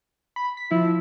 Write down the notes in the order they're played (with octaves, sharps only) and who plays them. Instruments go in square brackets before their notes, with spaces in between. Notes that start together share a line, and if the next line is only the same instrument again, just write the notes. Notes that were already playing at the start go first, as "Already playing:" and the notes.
[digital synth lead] B5
B6
[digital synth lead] F3 [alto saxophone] E4